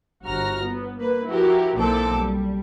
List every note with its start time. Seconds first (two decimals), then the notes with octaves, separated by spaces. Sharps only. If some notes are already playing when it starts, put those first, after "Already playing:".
0.23 G1 F#4 A#5 F6 A#6
0.66 B3
0.99 A#3 B4
1.28 F3 E4 F#4 G4 A#4
1.75 B1 A#2 E3 C4 A4 D6
2.14 G3